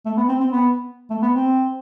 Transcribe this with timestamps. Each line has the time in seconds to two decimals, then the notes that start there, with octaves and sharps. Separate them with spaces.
0.06 A3
0.17 B3
0.29 C4
0.40 C4
0.52 B3
1.10 A3
1.22 B3
1.34 C4